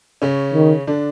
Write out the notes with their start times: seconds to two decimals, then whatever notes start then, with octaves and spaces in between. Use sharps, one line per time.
0.22 C#3 C#4
0.54 D#3
0.87 D3 D4